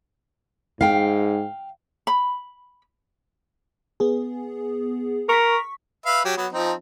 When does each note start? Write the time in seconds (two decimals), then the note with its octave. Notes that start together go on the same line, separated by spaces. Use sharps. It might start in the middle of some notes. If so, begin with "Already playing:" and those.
0.81 G#2 F5 G5
2.07 B5
4.00 B3 G#4
5.29 A#4 C#6 B6
6.06 B4 E5 F5
6.25 F#3 G4
6.37 F#3 B3
6.53 F3 C4 D#4